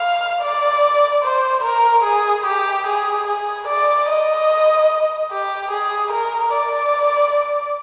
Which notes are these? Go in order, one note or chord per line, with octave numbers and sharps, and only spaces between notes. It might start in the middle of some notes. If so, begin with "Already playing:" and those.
Already playing: F5
D5
C5
A#4
G#4
G4
G#4
G#4
D5
D#5
G4
G#4
A#4
D5